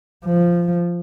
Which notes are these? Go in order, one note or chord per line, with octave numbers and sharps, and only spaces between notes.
F3